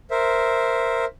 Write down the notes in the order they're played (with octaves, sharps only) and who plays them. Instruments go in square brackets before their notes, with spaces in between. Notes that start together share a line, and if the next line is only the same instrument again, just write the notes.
[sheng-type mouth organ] A#4 C5 E5